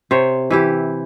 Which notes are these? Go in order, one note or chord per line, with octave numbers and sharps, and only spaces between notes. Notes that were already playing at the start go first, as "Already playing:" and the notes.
C3 C5 C#5
E3 E4 G4